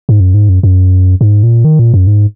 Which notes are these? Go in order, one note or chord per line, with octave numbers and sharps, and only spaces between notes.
G#2
F#2
G#2
F#2
F#2
G#2
A#2
D#3
A#2
F#2
G#2